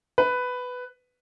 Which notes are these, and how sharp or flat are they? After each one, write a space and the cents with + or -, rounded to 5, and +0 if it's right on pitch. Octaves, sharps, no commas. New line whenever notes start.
B4 +10